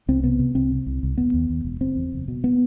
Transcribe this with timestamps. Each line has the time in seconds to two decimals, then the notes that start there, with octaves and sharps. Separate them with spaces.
0.08 C2 C4
0.23 C3 B3
0.39 C3
0.55 C2 C4
0.72 C3
0.87 C2
1.03 C2
1.18 E1 B3
1.34 D#2
1.50 D#2
1.65 E1
1.80 F#1 C4
1.96 E2
2.13 F#1
2.28 B2
2.44 B3